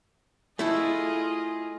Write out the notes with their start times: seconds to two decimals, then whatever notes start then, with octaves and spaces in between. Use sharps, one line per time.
0.59 A3 E4 F4 G#4 A4 D#5